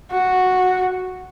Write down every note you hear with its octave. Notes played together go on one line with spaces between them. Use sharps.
F#4